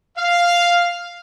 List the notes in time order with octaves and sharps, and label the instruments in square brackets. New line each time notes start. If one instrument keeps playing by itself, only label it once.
[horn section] F5